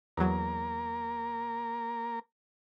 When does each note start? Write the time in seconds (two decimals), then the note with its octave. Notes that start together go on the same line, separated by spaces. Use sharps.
0.17 E2 F#3 A#3 A#4